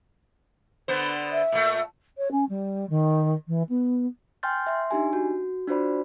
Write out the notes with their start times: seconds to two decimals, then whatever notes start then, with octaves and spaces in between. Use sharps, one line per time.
0.88 D3 B3 C5
1.32 E5
1.52 A#2 A3
2.18 C#5
2.31 C#4
2.49 G3
2.89 D#3
3.48 E3
3.69 B3
4.43 G5 G#5 C6 F6 G6 A6
4.67 E5 C6
4.91 D4 D#4 G4 G#5
5.13 F#4
5.68 D4 F4 F#4 C5 D5 B5